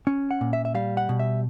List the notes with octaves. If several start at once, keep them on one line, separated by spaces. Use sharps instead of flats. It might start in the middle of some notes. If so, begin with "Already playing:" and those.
C#4
F#5
A#2
E5
E5
G3 F5
F#5
B2
E5